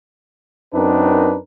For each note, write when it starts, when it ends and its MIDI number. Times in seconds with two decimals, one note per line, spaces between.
0.73 1.36 42
0.73 1.36 60
0.73 1.36 62
0.73 1.36 63
0.73 1.36 70
0.73 1.36 71